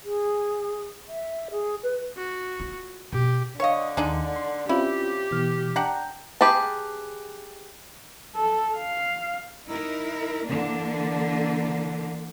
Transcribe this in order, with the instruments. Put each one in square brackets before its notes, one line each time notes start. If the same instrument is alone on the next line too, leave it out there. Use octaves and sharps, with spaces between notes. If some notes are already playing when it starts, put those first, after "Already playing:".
[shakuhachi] G#4
E5
G#4
B4
[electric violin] F#4
[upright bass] F4
[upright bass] B2 [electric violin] G4
[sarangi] D3 [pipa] C#5 D#5 [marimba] F5 C#6
[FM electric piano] D#2 [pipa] G#3 D4 D#4
[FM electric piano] C6
[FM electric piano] C4 C#4 F4 [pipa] E4 [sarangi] G4
[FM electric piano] B2 E3 F6
[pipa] D4 F#5 A#5 [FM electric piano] G5
[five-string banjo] G4 G#4 B4 A5
[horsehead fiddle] A4
F5
[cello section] D#4 E4 A#4
D3 E3 A#3 D4